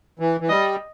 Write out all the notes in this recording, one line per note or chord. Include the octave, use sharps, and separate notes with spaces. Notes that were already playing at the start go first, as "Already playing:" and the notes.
E3
E3
G3 D#5